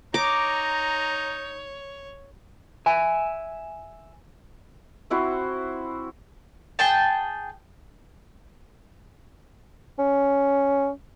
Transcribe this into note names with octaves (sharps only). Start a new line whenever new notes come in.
D#4 C#5 A#5 D6
E5 G#5
C4 E4 F#4 C5
G#4 G5 A5
C#4